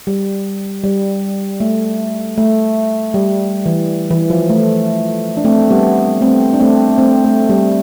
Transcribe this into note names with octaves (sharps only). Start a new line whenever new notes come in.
G3
G3
A3
A3
G3
E3
E3
F3
A3
D4
A3 C4
G3 B3
A3 C4
D4
A3 C4
A3 C4
A3
G3